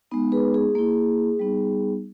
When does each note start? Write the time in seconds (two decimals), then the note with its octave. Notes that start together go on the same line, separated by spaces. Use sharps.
0.11 G#3 B3 D#4
0.32 G#4 B4
0.54 G#4
0.75 A#3 E4
1.39 G3 B3 D#4